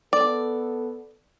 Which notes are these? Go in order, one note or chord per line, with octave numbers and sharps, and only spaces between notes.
B3 A4 D5